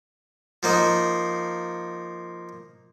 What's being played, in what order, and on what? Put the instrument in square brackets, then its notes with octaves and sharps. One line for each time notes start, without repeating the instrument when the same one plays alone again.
[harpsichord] F3 A#3 D#4